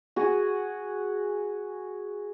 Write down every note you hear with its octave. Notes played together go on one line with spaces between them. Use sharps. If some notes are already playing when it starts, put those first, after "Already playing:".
F#4 G#4